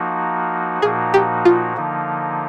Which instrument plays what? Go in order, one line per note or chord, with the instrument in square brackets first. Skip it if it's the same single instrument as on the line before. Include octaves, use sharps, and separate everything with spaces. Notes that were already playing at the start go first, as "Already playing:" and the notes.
Already playing: [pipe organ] F3 A#3 D#4 F#4
[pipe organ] A#2 F3 A#3 D#4 F#4 [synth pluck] G#4
[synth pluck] G4
F4
[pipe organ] D3 F3 A#3 D#4